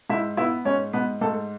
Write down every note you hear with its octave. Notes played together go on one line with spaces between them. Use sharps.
G#2 E4 E5
B3 E4 E5
G#2 C#4 C#5
G#2 B3 B4
G#2 A3 A4